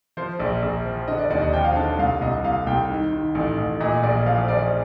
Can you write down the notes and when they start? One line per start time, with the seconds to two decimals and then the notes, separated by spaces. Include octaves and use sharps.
0.17 F3 C5
0.39 A#1 D5
0.62 A#1
0.85 F3
1.08 D3 D#5
1.19 D5
1.26 D#5
1.30 D#2 D5
1.42 D#5
1.53 F3 G5
1.64 F5
1.76 D3 A5
1.99 C2 F5
2.21 C2 D#5
2.44 C2 F5
2.67 C2 G5
2.90 D#3
3.12 D#3
3.35 A1
3.58 A1
3.80 A#2 D#5
4.03 A#1 D5
4.26 F3 F5
4.48 F3 D5